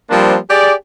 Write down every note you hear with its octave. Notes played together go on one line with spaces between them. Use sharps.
F3 G3 A#3 C4 D4
G4 G#4 D5